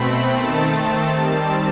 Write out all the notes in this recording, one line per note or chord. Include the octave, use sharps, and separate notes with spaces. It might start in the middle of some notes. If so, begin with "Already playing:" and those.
Already playing: B2 A3 C4 B5
D#3 A3 C4 A5
D#3 G3 C4